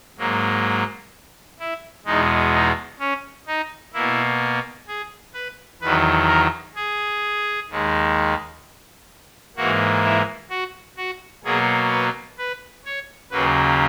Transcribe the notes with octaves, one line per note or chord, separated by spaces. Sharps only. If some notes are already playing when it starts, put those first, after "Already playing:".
G#2 F#3 A#3
E4
E2 B2 G#3 D#4
D#4
C#4
D#4
B2 A#3 E4
G#4
B4
E2 D#3 F#3 B4
A#4
G#4
D#2 D#3 G#3
G#2 E3 A#3 F#4
E4
F#4
F#4
B2 F#3 A#3 G#4
B4
B4
C#5
D#2 C#3 F#3 A#3 B4